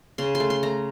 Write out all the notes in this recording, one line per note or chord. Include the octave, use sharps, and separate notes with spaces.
C#3 C6
C6
A3
C6
A3 A#5